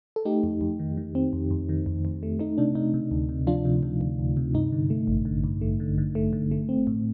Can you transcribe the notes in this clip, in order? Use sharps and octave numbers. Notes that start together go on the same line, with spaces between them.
A4
A3 D#4 G4
F2
F2
D#3
D#3
C4
F2
F2
D#3
F2
F2
A3
A3 D#4
C3 D4
C3 D#4
C3
D2
C3
F3 D4 F4
C3
C3
D2
D2
C3
G2 D#4
D3
A3
A1
D3
G2
A3
D3
D3
A3
D3
A3
C4
A2